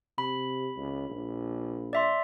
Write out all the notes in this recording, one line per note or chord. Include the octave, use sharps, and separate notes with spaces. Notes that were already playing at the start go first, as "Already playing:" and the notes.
C3 B5
C#2
A#1
D5 E5 C6